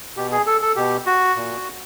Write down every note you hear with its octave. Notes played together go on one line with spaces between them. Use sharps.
B2 G4
G#4
A4
A4
B2 G4
F#4
A#2